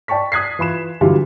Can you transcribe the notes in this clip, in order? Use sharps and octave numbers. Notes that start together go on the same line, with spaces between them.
D5 G5 A5 C#6 B6
D#6 F#6 G#6 B6 C7
E3 F4 B5 E7
D3 E3 F#3 G3 E4 F4